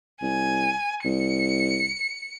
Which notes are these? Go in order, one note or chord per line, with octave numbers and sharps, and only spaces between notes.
C2 G#5
C2 C#7